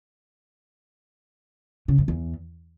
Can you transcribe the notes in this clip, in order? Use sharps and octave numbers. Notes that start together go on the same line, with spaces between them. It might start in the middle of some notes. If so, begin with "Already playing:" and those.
C#3
F#2
E2